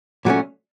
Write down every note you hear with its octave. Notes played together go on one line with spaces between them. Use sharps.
A#2 F#3 A3 C#4